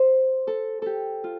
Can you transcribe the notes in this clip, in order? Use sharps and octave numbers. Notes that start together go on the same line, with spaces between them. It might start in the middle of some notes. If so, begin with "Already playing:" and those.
Already playing: C5
A4
G4 A4
F4